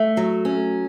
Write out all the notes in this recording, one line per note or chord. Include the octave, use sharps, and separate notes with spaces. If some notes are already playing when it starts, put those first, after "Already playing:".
Already playing: A3
F#3
C#4